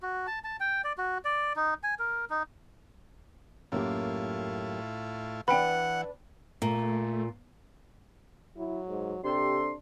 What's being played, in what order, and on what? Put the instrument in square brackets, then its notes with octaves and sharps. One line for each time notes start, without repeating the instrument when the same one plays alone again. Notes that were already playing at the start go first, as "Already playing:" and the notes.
[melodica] F#4
A5
A5
G5
D5
F#4
D5
D#4
G#5
A#4
D#4
[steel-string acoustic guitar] F#2 A#3 G4 [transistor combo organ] A2 E4 F4
[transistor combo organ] E3 [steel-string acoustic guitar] D4 B4 [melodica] F#5 [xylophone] G5 B5
[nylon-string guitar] A#2 [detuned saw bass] A3
[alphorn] F#3 [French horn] E4
[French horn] G#2
[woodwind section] C3 A4 C6 [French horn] D4 [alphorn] G4